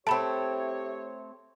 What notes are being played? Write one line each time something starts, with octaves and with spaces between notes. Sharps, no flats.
A3 C4 E4 G4 C#5 A5 B5